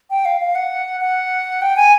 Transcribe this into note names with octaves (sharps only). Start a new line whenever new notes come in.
G5
F5
F5
F#5
F#5
G5
G#5